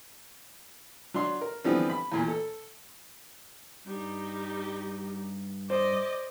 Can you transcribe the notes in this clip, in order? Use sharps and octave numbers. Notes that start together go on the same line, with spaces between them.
F#3 D4 C6
A#4
D3 E3 F3 G3 B3 C4
B5
E2 A#2
A4
G2 G3 D#4
C5 D5 D#5